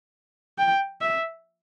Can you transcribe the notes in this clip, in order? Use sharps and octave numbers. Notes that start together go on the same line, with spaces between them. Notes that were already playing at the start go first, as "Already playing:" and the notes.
G5
E5